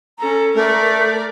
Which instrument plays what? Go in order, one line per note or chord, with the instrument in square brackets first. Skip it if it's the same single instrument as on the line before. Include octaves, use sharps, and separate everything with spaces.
[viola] C#4 A4 [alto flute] A#5
[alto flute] A3 [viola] A#4 D5